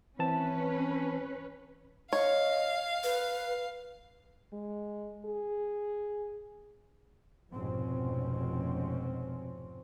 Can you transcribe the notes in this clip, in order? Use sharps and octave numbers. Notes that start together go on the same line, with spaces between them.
E3 C4 C#4 B4 A5
C#5 D#5 F5
B4
G#3
G#4
F1 G#2 B2 F3 C4 C#4